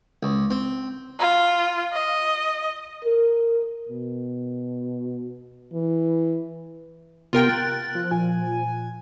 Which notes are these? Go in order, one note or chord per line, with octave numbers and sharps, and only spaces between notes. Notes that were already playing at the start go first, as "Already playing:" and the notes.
C#2
C4
F4
D#5
A#4
B2
E3
C3 B3 F4 A#4 G5
F#6 A6
F3
A#2 G#5